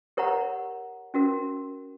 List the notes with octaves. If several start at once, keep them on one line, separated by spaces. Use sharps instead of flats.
G4 A#4 C#5 F#5 A#5
C#4 F#4 A#4